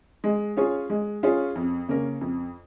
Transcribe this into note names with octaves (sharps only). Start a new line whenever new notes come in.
G#3
C#4 F4 G#4 C#5
G#3
C#4 F4 G#4 C#5
F2
C#3 A#3 C#4 A#4
F2